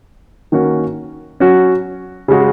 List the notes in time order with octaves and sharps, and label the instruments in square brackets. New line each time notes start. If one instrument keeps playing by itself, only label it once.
[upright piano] D#3 A#3 C#4 F#4
F#3 C#4 F#4
C#3 G#3 F#4